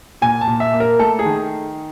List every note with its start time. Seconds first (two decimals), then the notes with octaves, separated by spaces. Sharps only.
0.21 A#2 G#5
0.41 A5
0.47 A#2
0.60 E5
0.73 A#3
0.80 A#4
0.99 A3 A4
1.19 G#4
1.25 D#3